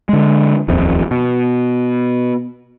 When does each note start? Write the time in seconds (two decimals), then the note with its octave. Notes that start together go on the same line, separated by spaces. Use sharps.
0.09 D3 G#3
0.68 D#1 A#1 F2
1.11 B2